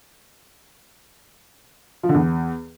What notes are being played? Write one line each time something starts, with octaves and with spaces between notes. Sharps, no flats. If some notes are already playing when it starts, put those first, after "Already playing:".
F3
D3
E2